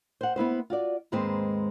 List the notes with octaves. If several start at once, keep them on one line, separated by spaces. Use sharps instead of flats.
C5 F#5
B3 E4 B4 C5
F4 F#4 D5
D#2 G#2 G#3 C4 B4 C5